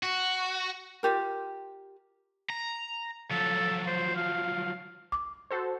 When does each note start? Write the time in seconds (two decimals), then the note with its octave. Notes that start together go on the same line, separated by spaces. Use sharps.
0.03 F#4
1.03 F4 G4 A#4
2.50 A#5
3.31 F3 F#3 A4
3.87 C5
4.16 F5
5.12 D6
5.51 F#4 A4 C5